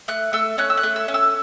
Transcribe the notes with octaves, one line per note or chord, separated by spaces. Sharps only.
A3 F#6
A3 E6
C#4 F#6
E6
F#6
A3
E6
C#4
E6